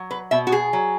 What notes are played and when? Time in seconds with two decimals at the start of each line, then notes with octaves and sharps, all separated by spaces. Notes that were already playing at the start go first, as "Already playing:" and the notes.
Already playing: F#3
0.11 B4
0.31 B2 E5
0.47 F#4
0.52 G#4
0.73 F#3